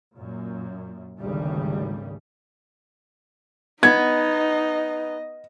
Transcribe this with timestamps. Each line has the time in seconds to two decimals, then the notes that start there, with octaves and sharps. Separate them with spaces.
0.15 F#2 A#2
1.19 G#1 D2 C#3 G3
3.83 B3 D#4 D#5 G#6